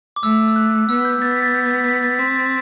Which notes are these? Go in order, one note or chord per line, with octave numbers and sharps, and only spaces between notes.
D6
A3 E6
E6
F#6
B3 E6
G6
B3 A6
B6
A6
G6
A6
B6
A6
C4 B6
A6